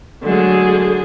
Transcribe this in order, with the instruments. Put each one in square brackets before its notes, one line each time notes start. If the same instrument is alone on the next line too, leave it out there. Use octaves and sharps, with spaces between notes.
[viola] D3 G#4 [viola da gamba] F#3 G#3 A3